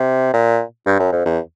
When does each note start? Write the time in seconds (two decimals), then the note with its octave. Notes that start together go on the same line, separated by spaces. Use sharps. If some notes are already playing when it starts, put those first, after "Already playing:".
Already playing: C3
0.34 A#2
0.86 G2
0.99 F#2
1.12 F2
1.25 E2